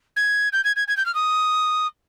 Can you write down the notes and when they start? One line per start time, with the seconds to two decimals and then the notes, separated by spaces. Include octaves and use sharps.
0.16 G#6
0.53 G6
0.65 G#6
0.76 G#6
0.88 G#6
0.97 G6
1.06 F6
1.15 D#6